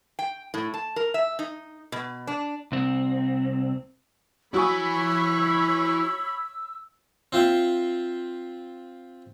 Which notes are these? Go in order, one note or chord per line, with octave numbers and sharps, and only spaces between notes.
G5
A2
A5
A#4
E5
D#4
B2
D4
C2 C4
F#3 E4 C#5 G#5 B5 C#6 E6
C4 F4 E5 G5